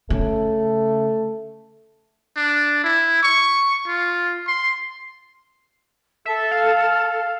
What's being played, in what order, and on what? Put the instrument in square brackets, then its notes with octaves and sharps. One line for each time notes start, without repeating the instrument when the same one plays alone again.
[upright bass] C#3 [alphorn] A3
[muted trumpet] D4
E4
C#6
F4
C6
[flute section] A4 [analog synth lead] E5
[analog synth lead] F5